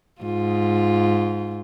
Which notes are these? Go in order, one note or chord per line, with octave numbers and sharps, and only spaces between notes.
G#2 F4